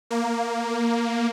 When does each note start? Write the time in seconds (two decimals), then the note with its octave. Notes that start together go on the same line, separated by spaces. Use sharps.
0.11 A#3